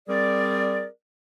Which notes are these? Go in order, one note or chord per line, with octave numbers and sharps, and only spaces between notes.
G3 C4 G#4 A#4 D5